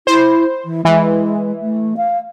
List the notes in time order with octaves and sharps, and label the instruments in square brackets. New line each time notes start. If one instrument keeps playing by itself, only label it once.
[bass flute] E4 [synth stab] C5
[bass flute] E3
[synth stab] E3 [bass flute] G#3
[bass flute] A3
F5